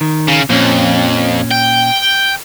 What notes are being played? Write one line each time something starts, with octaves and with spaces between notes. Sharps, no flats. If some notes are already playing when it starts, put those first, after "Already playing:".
D#3
C#3
F2 A#2 C#4
G5